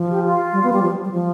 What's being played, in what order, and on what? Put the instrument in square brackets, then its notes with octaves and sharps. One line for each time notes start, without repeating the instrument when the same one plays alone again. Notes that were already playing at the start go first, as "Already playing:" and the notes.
Already playing: [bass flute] F3
[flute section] G4
F4
[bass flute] G3
B3
G3
F3
G3
F3